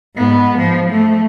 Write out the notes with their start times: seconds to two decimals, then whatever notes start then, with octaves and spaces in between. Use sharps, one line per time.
0.16 G#2 B3
0.59 F3
0.92 A3